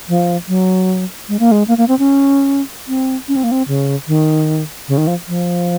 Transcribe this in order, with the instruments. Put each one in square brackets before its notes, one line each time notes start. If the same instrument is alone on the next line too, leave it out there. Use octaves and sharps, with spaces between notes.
[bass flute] F3
F#3
G#3
A#3
G#3
A#3
A#3
C4
C#4
C4
C#4
C4
A#3
C4
C#3
D#3
C#3
D#3
F3
F3